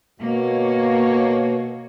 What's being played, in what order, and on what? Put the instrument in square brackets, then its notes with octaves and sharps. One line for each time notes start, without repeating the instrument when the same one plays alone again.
[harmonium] B2 [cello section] A#3 C#5